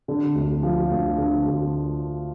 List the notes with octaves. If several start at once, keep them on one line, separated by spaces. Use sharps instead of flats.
D3
D2
F3
D2
D3
D2